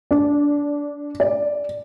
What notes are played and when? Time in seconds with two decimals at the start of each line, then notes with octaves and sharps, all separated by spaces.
0.11 D4
1.20 D5